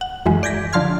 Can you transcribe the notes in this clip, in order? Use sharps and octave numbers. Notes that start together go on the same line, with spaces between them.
F#5
F#2 E3 G#3
D5 G6 G#6 A#6 B6
D3 F3 A5 C6 F6 G#6